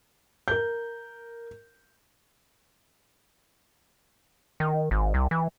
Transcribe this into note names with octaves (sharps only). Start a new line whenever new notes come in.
A#4 G6
D#3
G#1
C2
E3